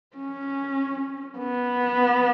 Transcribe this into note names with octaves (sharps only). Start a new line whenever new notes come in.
C#4
B3